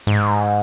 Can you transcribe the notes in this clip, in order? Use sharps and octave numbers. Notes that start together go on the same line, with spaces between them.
G#2